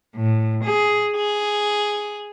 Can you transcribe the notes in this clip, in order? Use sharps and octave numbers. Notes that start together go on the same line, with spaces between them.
A2
G#4
G#4